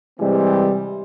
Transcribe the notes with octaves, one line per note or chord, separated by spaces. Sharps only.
C3 E3 G3 G#3 C4 G4